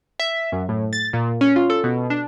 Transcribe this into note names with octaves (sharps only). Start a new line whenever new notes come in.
E5
F#2
A2
A6
A#2
C#4
F4
A4
B2
D4